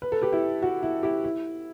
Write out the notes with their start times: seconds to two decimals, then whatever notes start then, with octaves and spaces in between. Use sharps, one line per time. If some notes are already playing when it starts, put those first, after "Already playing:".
0.02 B4
0.12 A4
0.22 G4 B4
0.32 E4 G4
0.62 F#4
0.83 E4
1.03 E4 G4
1.24 E4